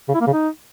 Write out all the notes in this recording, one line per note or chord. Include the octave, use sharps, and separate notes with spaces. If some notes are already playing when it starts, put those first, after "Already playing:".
C#3
E4
A#3
C#3
D#4